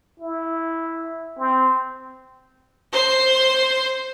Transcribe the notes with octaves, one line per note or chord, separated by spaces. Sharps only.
E4
C4
C5 C6